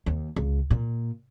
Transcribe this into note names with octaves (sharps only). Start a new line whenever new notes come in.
D#2
C#2
A#2